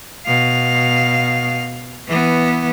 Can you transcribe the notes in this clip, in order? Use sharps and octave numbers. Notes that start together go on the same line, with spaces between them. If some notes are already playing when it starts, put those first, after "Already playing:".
B2 F5
E3 B3